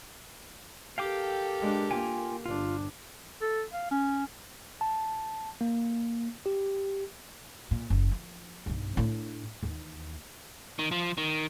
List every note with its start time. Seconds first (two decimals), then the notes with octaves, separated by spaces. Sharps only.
0.98 G4 A4 A#4 F5 G5 D6
1.60 G#3 D4
1.91 A#3 F4 G5 G#5
2.46 G1 D4 F4
3.41 A4
3.73 F5
3.91 C#4
4.81 A5
5.61 A#3
6.46 G4
7.71 A#2
7.90 F#1
8.11 F3
8.66 B1 G2
8.97 A2 D4
9.63 D#2 E3
10.79 D#3
10.91 F3
11.18 D#3